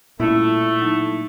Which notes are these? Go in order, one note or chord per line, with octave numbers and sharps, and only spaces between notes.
A#2 G3 A3 C#4 E4 F4
F#3 D#4